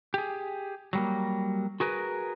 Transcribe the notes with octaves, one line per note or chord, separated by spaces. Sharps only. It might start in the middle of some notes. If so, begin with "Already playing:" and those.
G4 G#4
F#3 G3 A#3
F#4 G#4 A#4 B4